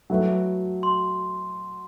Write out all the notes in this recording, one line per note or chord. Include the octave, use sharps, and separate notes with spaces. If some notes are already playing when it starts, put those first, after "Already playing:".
F#3 A3 E4 B4
C6